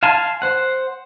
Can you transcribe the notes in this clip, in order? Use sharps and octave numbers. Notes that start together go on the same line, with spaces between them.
F5 G#5 A5 C6
C5 F#5